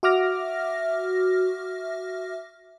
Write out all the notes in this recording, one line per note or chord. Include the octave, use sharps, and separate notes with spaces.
F#4 E5 D6 F6 A#6